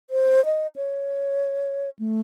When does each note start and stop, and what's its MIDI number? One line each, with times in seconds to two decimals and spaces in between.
0.10 0.44 72
0.45 0.67 75
0.76 1.90 73
1.99 2.21 57